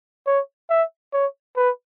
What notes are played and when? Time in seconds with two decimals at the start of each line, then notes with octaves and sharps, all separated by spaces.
0.27 C#5
0.70 E5
1.13 C#5
1.57 B4